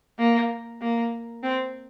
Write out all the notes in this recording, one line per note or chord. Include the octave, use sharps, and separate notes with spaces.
A#3
A#3
C4